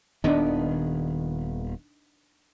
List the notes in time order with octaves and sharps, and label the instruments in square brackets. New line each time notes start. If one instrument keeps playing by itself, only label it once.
[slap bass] D#1 D#3 B3 [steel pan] D4 D#4